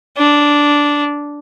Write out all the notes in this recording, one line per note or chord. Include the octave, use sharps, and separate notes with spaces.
D4